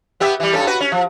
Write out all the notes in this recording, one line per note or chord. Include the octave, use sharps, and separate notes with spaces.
B3 G4 E5
E3 G3
G2 C#4 A4
F#4 B4
C#4
F3